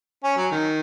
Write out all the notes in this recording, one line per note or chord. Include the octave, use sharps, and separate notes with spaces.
C#4
F#3
D#3